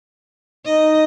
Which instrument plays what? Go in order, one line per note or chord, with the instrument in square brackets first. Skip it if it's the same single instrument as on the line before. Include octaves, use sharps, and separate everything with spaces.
[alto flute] D#4 [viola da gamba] D#5